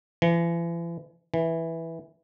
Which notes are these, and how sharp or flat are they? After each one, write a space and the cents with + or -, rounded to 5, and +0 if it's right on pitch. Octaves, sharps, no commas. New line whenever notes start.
E3 +40
E3 -5